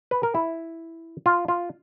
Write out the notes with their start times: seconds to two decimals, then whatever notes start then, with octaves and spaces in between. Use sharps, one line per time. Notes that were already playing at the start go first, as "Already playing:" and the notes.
0.11 B4
0.23 A#4
0.35 E4
1.26 F4
1.48 F4